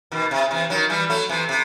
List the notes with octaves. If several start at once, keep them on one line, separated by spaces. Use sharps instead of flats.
B2 D#3
C3
C3 E3
D#3 F#3
E3 G3
F#3 A3
C3 E3
C3